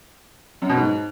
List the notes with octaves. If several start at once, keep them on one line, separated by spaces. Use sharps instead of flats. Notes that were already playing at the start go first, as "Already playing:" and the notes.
F#2
B2
G#2